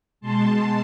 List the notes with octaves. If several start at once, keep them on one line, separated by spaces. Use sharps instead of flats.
B2 G#3 A5 C6